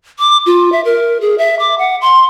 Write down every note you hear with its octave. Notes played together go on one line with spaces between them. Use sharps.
D6
F4
E5
A#4
G#4
E5
D6
F#5
C6